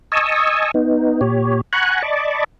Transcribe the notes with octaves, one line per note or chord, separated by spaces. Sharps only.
D#5 G#5 A5 C#6 D#6 E6
B3 D#4
A#2 G4 C#5
F#5 G#5 A#5 B5 C#6 F#6
D5 D#5 A5 B5 C#6 D6